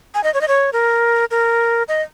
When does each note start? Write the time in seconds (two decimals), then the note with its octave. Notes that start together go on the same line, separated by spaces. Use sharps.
0.14 G#5
0.24 D#5
0.34 C#5
0.41 D#5
0.48 C#5
0.73 A#4
1.31 A#4
1.88 D#5